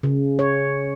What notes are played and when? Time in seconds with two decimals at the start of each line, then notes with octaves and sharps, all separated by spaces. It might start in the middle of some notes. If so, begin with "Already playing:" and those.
0.03 C#3
0.39 C#5